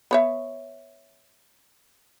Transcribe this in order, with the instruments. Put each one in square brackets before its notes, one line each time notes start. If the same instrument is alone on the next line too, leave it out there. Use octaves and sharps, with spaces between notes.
[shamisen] B3 C#5 E5